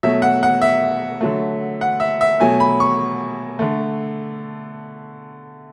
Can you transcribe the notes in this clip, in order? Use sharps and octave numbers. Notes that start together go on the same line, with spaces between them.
B2 F#3 A3 E5
F#5
F#5
E5
D3 F#3 A3
F#5
E5
E5
B2 F#3 A3 G#5
B5
C#6
D3 A3